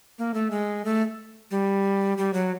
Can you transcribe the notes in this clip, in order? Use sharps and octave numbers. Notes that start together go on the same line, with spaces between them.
A#3
A3
G#3
A3
G3
G3
F#3